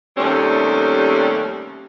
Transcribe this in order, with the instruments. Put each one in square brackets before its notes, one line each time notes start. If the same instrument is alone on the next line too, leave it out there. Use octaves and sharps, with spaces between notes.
[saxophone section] D#2 C3 G3 A3 C#4